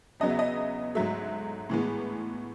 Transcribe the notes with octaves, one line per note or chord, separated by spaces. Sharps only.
E2 C#3 F#3 B3 D#5
E5
D#5
G#2 F#3 A3 E5
A2 E3 G#3 B3